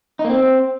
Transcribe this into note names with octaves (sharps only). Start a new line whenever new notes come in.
D#4
A#3
C4